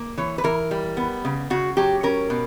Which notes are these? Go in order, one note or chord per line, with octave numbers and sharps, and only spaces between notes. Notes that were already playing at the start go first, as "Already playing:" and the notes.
Already playing: A#3
E3 C#5
B4
E3 A#4
G3
B3
C#3
C#3 F#4
F#3 G4
C#4 A#4
B2